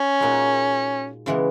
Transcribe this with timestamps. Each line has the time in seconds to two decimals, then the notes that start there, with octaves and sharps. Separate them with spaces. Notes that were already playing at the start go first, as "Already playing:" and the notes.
Already playing: C#4 G#4
0.20 A#2 G#3 D#4 F#4
1.26 C#3 E3 G#3 B3